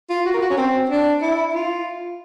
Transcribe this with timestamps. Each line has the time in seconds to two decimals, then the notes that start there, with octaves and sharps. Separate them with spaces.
0.10 F4
0.26 F#4
0.34 A#4
0.42 F#4
0.50 C#4
0.57 C4
0.90 D4
1.22 E4
1.54 F4